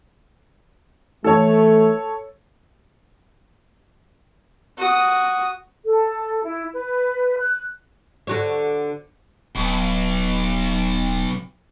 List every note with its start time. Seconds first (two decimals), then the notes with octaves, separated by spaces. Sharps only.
1.24 E3 A3 A4 C#5
4.77 F#4 D#6
5.86 A4
6.44 E4
6.74 B4
7.37 F#6
8.27 D3 F#4 C#5
9.55 D1 B1